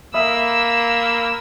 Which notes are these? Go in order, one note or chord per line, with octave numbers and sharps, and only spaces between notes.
A#3 E5 B5 D#6 E6